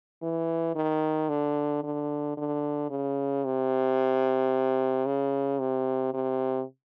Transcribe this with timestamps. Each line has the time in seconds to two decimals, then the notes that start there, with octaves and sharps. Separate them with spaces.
0.23 E3
0.76 D#3
1.29 D3
1.84 D3
2.38 D3
2.90 C#3
3.45 C3
5.06 C#3
5.60 C3
6.14 C3